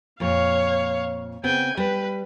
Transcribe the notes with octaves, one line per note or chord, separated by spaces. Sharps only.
F2 A#2 C#5 F5
C#3 B3 C4 G5 G#5
G3 B4